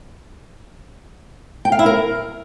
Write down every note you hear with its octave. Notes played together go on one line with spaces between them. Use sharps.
G5
F5
E4
A#4